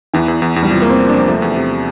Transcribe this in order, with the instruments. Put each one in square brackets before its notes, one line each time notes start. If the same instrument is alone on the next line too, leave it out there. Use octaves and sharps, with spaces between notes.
[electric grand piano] E2 [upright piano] E3
[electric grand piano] E2
E2
E2
[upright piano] G3
[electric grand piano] C3 [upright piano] F3
[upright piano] A#3
[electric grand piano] E2
[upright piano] C4
[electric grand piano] F3
[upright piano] D4
[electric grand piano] F3
[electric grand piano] F3 [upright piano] A3
[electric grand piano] E2
C3